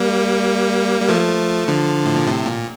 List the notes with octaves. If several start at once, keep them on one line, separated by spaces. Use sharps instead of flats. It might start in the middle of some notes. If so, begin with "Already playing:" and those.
Already playing: G3 A#3
G3
F3 A3
D3 F3
A2
A#2
A2 C3
A#2